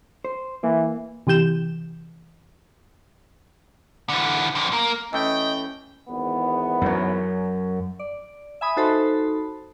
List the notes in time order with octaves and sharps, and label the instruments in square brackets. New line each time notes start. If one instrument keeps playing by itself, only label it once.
[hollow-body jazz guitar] C5
[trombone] E3 [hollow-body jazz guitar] A#3
[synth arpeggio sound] C3 E3 G4 G6 E7
[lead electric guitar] D3 E3
F2 D3
A#3
[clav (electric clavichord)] E3 A3 [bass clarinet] C#4 [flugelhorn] D#5 [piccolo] G5
[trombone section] G#1 E2 B3
[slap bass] F#2 F#3
[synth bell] D5
E5 G#5 B5 D#6
D#4 F#4 A4 C5 A5 B5